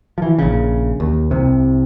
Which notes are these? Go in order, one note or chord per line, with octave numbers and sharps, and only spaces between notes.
E3 F3
A#1 C#3
D#2
C2 C3